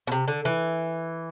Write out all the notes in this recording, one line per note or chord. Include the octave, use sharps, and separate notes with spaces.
B2
C3
D3
E3